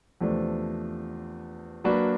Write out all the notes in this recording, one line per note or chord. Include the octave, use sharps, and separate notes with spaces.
E2 C3 F3 A3 D4
F#3 A#3 D4 F#4 B4